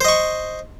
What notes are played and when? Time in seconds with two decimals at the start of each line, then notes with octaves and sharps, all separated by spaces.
0.01 C5
0.05 D#5
0.08 C#6